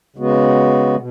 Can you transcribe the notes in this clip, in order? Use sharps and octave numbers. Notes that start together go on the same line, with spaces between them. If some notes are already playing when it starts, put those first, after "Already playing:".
C#3 G#3 B3 F#4
B2